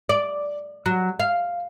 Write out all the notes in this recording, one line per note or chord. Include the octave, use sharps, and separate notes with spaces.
D5
F#3
F5